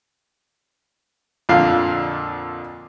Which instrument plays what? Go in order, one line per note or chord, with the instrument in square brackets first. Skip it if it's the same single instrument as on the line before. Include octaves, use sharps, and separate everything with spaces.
[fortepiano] F2 A#2 D3 F5